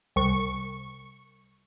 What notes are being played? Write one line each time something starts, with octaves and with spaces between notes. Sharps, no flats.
C2 C#6